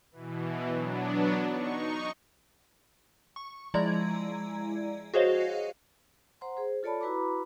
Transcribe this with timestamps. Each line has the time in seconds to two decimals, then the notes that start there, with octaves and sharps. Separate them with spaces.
0.12 B2 E3
0.70 F#3 B3 D4
1.48 D#4 C#6
3.36 C#6
3.74 F3 G#3 E4 D5 A#5 G#6
5.14 F#4 G#4 C5 C#5 D#5 F5
6.41 C5 F#5 A#5 C6
6.57 G#4 C5
6.83 F4 A4 C#5 D5 A5 B5
7.01 E4 F#4 B4 A#5 B5 D6